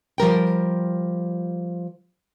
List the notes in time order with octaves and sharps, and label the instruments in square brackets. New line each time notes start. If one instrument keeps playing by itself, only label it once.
[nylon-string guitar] F3 G3 A#4 G5